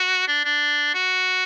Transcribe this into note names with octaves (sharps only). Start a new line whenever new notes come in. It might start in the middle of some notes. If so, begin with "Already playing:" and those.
Already playing: F#4
D4
D4
F#4